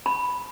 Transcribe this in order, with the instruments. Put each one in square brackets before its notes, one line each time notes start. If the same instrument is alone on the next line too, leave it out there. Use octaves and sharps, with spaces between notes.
[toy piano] B5